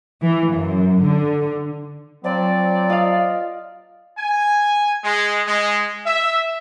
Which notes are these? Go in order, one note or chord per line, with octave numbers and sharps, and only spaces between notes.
E3
F#2
D3
F3 F#3 C4 D5
F4 D#5 F5
G#5
G#3
G#3
E5